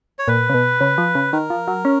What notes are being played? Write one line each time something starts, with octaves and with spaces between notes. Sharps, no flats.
C#5
A#2 B4
C#3
B2
C#3
F3
C#3
D#3 A#4
F3
F#3
C#4